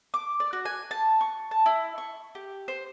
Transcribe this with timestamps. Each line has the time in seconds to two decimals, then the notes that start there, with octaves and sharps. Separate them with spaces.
0.14 D6
0.40 D5
0.53 F#4
0.65 G#5
0.91 A5
1.21 C#6
1.51 A5
1.66 E4
1.98 C#6
2.35 G4
2.68 C5